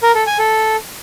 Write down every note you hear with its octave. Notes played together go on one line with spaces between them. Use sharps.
A#4
A4
G#5
A4